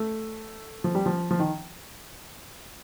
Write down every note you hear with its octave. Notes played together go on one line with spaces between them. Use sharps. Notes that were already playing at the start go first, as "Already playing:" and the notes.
Already playing: A3
F3
G3
F3
F3
D#3